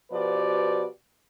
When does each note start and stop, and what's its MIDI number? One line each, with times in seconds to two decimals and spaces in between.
0.11 0.85 47
0.11 0.85 53
0.11 0.85 66
0.11 0.85 67
0.11 0.85 71
0.11 0.85 74